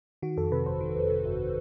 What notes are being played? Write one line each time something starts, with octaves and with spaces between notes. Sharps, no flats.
D#3 F#4
F2 A4
C3 B4
G1 C5
D#3
F2
C3
G1